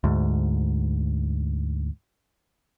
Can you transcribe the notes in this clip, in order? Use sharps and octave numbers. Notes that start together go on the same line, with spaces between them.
D2 G#2